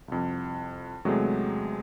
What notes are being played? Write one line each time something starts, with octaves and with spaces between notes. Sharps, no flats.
C2 F2
E2 C3 F#3 G#3 A3